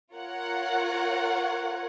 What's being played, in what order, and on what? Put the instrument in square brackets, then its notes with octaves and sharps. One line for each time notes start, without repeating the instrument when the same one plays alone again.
[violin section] F4 A#4 C#5 F#5